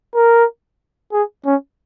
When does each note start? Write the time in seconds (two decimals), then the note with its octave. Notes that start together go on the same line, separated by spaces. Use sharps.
0.15 A#4
1.13 G#4
1.46 C#4